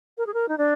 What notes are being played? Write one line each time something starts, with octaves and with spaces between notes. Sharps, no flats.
A#4
G#4
A#4
D#4
D4